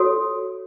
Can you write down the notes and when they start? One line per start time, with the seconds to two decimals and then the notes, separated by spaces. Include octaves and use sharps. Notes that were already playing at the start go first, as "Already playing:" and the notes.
Already playing: F#4 A4 C#5